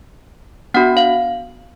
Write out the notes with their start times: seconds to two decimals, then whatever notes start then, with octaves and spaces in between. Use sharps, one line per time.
0.74 B3 D4 F#4 F#5
0.97 F5